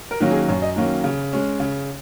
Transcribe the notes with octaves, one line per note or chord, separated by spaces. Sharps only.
A#4
D#3 F#3 A#3 C#4
G#4
F#2 C#5
D#5
D#3 F#3 A#3 C#4
C#3
G#3 C#4
C#3